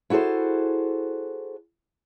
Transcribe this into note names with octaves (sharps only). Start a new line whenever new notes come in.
E4 F#4 G#4 A4 C5